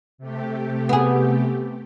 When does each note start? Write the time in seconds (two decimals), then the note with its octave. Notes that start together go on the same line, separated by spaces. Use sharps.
0.18 C3 A3 G4
0.89 B3 G#4